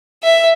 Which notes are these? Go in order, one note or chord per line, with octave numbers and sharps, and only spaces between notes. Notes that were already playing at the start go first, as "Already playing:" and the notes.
E5